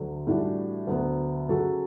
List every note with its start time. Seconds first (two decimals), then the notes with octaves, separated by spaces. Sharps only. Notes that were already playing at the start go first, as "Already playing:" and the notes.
Already playing: D2 D3 F#3
0.27 A2 E3 G3 D4 F#4
0.87 D2 D3 F#3 B3
1.49 C#3 F#3 C#4 F#4 A4